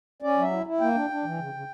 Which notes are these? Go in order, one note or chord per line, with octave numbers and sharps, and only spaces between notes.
C#4 D5
F#3 E5
E4
E4
A#3 G5
D4
D4
E3
C#3
C#3